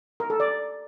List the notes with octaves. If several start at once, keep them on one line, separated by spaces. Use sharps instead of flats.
A#4
A4
D5